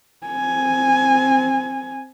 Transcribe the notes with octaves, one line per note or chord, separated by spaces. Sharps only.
C4 G#5